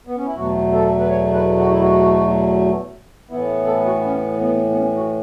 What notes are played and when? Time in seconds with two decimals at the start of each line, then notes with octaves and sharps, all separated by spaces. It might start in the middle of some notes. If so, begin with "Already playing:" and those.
0.07 B3
0.17 C#4
0.26 E4
0.35 E2 B2 F#3 A3 F#4
0.73 A4
0.99 B4
1.09 C#5
1.34 B4
1.58 F#4
1.70 E4
1.82 F#4
3.30 A2 E3 B3 E4
3.66 A4
3.86 F#4
4.04 C#4
4.41 B3
4.70 B3
4.77 C#4
4.96 F#4